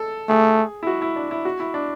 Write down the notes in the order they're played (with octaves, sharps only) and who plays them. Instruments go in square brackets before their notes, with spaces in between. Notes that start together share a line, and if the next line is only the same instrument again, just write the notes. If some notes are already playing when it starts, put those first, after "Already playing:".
Already playing: [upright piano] A4
[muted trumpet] A3 [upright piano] G#4
[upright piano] E4
F#4
E4
D4
E4
F#4
E4
D4